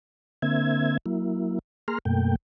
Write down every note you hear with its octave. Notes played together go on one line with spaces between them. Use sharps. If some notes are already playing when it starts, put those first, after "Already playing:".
D3 A#3 C4 E5 G#6
F#3 A#3 E4
A#3 G#4 A#5 C6 F6
F#2 B2 A3 A#3 G5